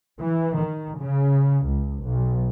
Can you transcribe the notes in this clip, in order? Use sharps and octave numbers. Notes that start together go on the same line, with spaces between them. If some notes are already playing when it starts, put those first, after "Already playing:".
E3
D#3
C#3
C#2
B1